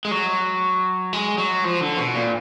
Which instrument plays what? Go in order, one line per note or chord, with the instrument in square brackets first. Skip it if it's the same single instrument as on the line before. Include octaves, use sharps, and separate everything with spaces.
[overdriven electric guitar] G#3
F#3
G#3
F#3
F3
D3
B2
A#2